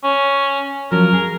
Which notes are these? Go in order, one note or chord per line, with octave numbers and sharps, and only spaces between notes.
C#4
F3 F#3 C#4 A#4
G#4